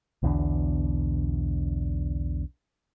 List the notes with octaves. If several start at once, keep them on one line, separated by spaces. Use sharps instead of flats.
B1 E2 B2 D3